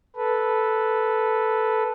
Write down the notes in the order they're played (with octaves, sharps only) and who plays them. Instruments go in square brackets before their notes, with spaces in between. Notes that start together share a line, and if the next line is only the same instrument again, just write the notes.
[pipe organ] A4 B4